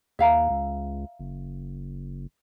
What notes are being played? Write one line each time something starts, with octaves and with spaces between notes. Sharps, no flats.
D#2 E5 F5 A#5
C#2
F#1